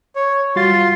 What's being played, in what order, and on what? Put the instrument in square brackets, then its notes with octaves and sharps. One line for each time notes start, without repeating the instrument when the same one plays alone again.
[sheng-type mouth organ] C#5
[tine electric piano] G3 F#4 A6 [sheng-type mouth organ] F4 C6